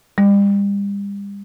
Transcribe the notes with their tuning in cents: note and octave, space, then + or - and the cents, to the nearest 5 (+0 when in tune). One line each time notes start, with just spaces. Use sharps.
G3 +40